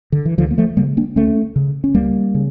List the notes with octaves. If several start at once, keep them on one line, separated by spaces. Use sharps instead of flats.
D3
E3
D2 D3 F3
A#3
F3 A3
C#3 G3 A#3
A#3 D4
D2 A3 C#4
C#3
C#4
C#2 G3 A#3
C#3